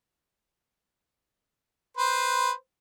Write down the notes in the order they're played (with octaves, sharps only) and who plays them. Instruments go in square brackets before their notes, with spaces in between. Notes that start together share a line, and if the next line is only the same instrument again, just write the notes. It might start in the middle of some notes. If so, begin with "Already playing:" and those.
[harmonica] B4 C5